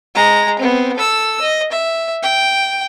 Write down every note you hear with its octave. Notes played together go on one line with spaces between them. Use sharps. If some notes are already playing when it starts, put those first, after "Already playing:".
G#3 A#5
B3 C4
A4 E6
D#5
E5
G5